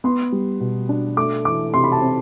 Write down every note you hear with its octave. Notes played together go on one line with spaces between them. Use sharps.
B3 C6
G3
B2
D4
A3 D6
E3 D6
C3 C6
B5
A5
C4